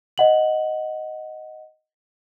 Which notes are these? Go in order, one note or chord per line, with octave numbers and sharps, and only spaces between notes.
D#5 F#5 F#7